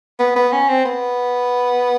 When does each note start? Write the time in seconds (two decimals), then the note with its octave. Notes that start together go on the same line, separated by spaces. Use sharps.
0.19 B3
0.36 B3
0.52 C#4
0.69 C4
0.85 B3